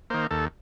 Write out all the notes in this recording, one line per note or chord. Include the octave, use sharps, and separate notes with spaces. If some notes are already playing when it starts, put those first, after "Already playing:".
D#3 A#3 C5
D#2 A4